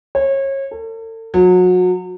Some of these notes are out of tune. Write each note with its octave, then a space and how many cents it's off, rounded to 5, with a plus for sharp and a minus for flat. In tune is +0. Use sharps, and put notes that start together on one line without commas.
C#5 -30
A4 +40
F#3 -30